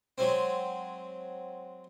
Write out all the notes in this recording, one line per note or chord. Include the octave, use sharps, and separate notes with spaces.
F#3 G#3 C4